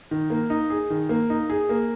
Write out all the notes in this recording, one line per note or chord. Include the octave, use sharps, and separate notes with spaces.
D#3
A#3
D#4
G#4
D#3
A#3
D#4
G#4
A#3